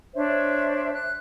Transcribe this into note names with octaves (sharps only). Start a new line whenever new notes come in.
D4 C5 C#5 E5
F#6